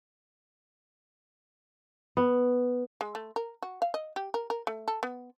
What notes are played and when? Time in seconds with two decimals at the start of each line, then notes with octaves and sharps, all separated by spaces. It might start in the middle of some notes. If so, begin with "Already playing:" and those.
2.17 B3
3.01 G#3
3.15 A3
3.36 A#4
3.63 F#4
3.82 F5
3.94 D#5
4.16 G4
4.34 A#4
4.50 A#4
4.67 A3
4.88 A4
5.03 B3